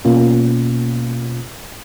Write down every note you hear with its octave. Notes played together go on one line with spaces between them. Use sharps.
B2 A#3 C#4 F4